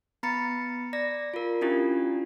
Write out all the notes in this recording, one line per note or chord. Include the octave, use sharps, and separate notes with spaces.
B3 A#5 B5 A6 C#7
D5 A#6
F4 A#4
C#4 D4 E4 F4 G4